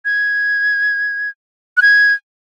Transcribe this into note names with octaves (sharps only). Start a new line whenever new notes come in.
G#6
F#6
G#6